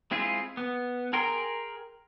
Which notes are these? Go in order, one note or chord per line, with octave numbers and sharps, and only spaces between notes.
G#3 C4 E4 F4 G#4
B3
G#4 A#4 G5 A#5 C6